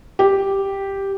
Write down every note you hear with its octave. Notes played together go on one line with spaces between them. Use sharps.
G4